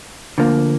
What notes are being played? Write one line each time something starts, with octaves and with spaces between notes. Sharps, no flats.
D2 D3 F3 A#3